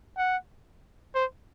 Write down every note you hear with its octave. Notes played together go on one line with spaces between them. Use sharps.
F#5
C5